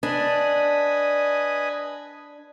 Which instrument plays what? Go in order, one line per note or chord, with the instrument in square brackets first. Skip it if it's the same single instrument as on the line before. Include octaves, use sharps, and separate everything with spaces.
[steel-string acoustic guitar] D4 [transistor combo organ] B4 D#5 G#5